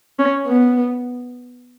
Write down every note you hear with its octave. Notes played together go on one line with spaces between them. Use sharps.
C#4
B3